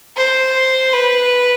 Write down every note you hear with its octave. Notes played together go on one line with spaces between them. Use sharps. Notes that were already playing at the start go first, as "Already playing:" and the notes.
C5
B4